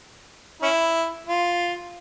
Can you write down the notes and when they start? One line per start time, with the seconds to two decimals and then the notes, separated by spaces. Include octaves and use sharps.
0.62 C#4 E4
1.27 F4